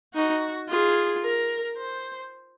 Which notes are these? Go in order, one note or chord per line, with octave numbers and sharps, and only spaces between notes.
D#4 F#4
F4 G#4
A#4
C5